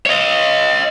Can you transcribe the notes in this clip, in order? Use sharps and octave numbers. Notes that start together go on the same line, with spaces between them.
C#5 D#5